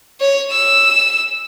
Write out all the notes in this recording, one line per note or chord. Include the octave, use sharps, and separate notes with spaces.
C#5
E6